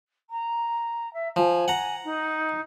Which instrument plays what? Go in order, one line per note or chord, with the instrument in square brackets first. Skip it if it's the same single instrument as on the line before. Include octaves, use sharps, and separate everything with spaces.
[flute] A#5
E5
[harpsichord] F3 [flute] G#5
[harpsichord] F#5 A#5
[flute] D#4